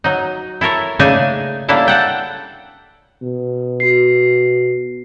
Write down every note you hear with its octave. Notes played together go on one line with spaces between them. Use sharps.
F#3 D#4
E4 A4 A#4 C#5
C#3 A3 A#3 D4 D#4 G#5
G3 A#3 C#4 D4 E4 A4
A4 F#5 G5
B2
F#4 C7